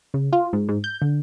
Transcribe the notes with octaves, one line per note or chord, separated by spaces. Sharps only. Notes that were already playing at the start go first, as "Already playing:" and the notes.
C#3
F4
G#2
G#2
G6
D3